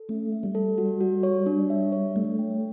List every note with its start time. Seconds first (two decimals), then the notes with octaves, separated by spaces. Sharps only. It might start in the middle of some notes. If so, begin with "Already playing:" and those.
Already playing: A4
0.09 A3 C#4
0.32 E5
0.43 G3
0.55 A4
0.78 F#4
1.01 F#4
1.23 C#5
1.46 D4
1.70 E5
1.92 C#5
2.16 A3 D4
2.39 G5